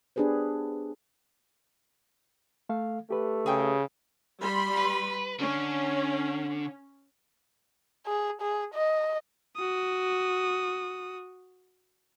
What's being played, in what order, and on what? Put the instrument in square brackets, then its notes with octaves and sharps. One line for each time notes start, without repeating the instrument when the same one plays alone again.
[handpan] B3 D4 G4 G#4 B4 C5
[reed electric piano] A3 A4 F5
[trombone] A3 [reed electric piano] G4 B4
[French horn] C#3 [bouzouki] G#4 G5
[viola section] G3 B5 C6
[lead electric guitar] B4
[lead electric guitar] D3 [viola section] C#4
[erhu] G#4
G#4
D#5
[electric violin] F#4 D#6